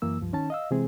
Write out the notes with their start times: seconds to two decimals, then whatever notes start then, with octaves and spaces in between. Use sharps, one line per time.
0.02 F#2 E3 A#3 E6
0.21 C#2 G2 F3
0.33 D#3 C#4 D#4 A5
0.50 D#5 F5 E6
0.71 C3 E3 G#3 C4 G#4